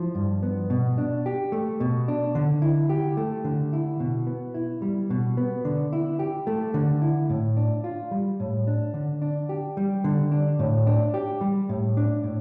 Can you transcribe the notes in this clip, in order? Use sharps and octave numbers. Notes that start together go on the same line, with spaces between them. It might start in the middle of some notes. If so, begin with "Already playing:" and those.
Already playing: F3 E4
G2
B3
B2
D4
G4
A3
B2
D4
D3
E4
G4
A3
D3
E4
B2
B3
E4
G3
B2
B3
D3
E4
G4
A3
D3
E4
A2
D4
F4
G3
A2
D4
D3
D4
G4
G3
D3
D4
A2
D4
G4
G3
A2
D4
A2